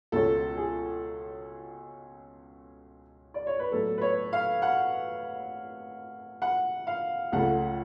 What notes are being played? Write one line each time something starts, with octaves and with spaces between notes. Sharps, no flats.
C#2 B2 G#3 C#4 A4
G#4
D5
C#5
B4
A2 F#3 B3 A4
B4
C#5
F5
F#5
F#5
F5
C#2 C#3 F3 A3 F#5